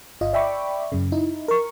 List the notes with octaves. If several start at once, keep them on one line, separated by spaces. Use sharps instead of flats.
G1 F4 D#5
D5 E5 G5 B5 C#6 D6
F#2 C#3
D#4 E4
A#4 C#6